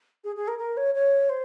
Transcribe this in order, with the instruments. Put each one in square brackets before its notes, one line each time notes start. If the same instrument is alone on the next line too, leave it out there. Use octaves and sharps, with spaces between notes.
[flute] G#4
G#4
A#4
A#4
C#5
C#5
C5